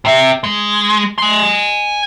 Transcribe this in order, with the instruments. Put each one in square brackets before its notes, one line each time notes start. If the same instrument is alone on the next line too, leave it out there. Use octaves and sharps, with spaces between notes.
[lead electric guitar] C3 E5
G#3
G#5 C6